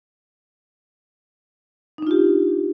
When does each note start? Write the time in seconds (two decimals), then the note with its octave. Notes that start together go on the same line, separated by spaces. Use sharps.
1.98 D#4
2.02 D4
2.07 F4
2.11 G4